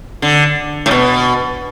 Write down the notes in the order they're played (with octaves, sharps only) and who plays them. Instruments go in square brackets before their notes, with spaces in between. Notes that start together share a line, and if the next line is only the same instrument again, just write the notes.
[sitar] D3
A2
B2